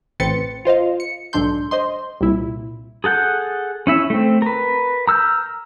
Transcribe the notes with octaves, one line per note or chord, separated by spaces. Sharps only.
A1 C4 B4 C6 A6 C#7
F4 C5 D#5 F5
C#7
B1 G#2 D4 A4 C6 G6
C5 D#5 C6
C2 A#2 E4
G#4 A4 F#5 G6
C#4 E4 E5
A3 C4
A#4 B4
A#5 E6 F6 G6